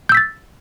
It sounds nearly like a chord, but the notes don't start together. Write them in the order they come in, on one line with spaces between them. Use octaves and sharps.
G6 E6 B6 A6